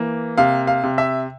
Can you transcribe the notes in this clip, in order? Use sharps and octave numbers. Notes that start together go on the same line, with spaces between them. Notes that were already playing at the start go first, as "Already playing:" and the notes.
Already playing: E3 A#3
C3 F5
F5
C3
E5